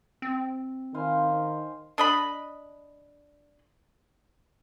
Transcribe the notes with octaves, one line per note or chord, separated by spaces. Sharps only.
C4
D#3 C5 F5 G#5
D4 D#5 B5